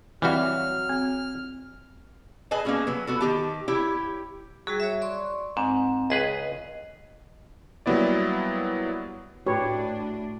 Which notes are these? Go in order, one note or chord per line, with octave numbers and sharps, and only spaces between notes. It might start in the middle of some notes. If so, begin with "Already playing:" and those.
E3 F#3 G3 C4 F#4 E5 F5 F6
C4
G#4 B4 D#5 G#5 A5
A#3 B3 C#4 F#4 G#4
F#3 B4
B3 F#4 A4
D#3 G4 A5
E4 G4 C#5
F#3 G3 F#4 G#4
C#5 E5
D5 C6 C#6
G#2 C4
C#2 G#4 B4 D#5
F#3 G3 A#3 B3 E4 D5
A2 D4 F#4 G4 B4 C#5